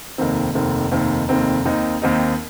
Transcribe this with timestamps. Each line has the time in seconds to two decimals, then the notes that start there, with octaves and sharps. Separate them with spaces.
0.18 F1 D#2 D#3 C4
0.55 F1 D#2 D#3 C4
0.91 F1 D#2 D#3 C4
1.29 F1 D#2 D#3 C4
1.65 D#2 D#3 C4 D#4
2.02 D#2 D#3 C4 D#4